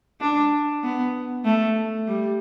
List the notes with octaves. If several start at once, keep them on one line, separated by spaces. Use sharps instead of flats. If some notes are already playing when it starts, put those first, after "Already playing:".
D4
B3
A3
G3